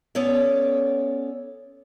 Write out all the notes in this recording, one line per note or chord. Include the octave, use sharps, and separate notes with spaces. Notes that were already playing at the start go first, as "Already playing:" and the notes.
B3 C#4 A4 C#5 D5